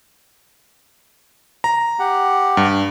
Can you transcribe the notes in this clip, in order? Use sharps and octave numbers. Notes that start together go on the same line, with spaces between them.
A#5
G4 F#5
G2